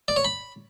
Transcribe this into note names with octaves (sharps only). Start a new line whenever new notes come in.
D5
C#5
B5